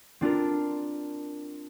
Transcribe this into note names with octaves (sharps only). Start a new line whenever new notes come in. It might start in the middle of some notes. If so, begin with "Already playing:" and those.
C4 D4 F4 A#4